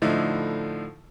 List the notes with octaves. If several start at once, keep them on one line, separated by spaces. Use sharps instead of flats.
A2 D3 F3 D#4 E4